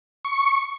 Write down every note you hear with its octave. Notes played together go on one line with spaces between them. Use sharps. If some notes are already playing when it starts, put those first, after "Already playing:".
C#6